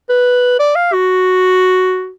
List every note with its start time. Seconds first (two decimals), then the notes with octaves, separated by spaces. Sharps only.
0.10 B4
0.59 D5
0.76 F5
0.93 F#4